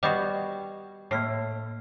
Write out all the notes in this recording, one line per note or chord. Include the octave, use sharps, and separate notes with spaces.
G3 B3 F#4 D#5 G5 G6
A2 A#3 F6 C7